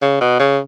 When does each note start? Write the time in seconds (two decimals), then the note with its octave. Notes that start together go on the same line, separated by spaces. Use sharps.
0.02 C#3
0.21 B2
0.39 C#3